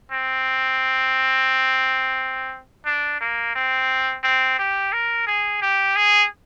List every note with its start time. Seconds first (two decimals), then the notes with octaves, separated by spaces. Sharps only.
0.12 C4
2.86 D4
3.20 A#3
3.55 C4
4.23 C4
4.59 G4
4.93 A#4
5.27 G#4
5.62 G4
5.96 G#4